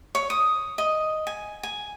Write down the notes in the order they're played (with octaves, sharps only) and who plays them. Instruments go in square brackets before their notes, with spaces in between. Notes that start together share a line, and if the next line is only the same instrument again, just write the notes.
[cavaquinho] C#5
D#6
D#5
G#5
G#5